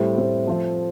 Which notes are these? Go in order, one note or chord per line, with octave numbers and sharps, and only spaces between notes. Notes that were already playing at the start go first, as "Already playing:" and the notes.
Already playing: A2 G3 C4
A2 G3 C4
F3 A3 C4 F4 C5